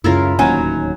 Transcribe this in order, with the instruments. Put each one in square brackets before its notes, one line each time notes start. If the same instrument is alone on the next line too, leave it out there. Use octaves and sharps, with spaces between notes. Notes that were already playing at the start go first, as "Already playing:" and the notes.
[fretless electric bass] C#2 C#3 [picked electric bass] F#2 [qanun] E4 F4 A#4
[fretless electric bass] D1 D#2 [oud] F#3 C#4 D#4 [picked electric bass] A#3